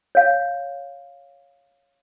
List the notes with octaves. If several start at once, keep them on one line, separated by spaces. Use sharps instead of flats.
C#5 F5